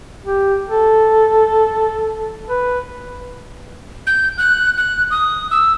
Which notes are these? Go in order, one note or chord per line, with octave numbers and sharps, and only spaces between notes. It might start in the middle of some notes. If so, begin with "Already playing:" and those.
G4
A4
B4
G6
F#6
F#6
D#6
E6